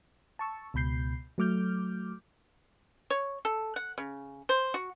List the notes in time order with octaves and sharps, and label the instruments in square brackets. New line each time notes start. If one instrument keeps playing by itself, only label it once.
[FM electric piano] A5 C#6 E6
C#2 B2 B5 G6 C7
F#3 A3 D6 F6 G6
[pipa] C#5
A4
F#5
C#3
C5
F#4